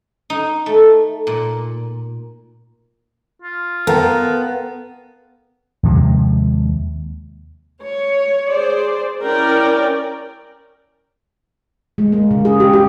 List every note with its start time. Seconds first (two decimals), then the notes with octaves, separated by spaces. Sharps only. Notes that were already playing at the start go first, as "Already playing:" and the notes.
0.30 D#4
0.66 A3
1.27 A#2
3.42 F4
3.87 B3 A4 A#4 F5 G5
5.83 D#2 C3 F3 G#3
7.83 C#5
8.51 G#4 C5 D5
9.23 C#4 E4 A#4 D5 G5
11.98 G#3
12.12 A#3
12.31 C#3
12.45 G#4
12.60 G4
12.73 G4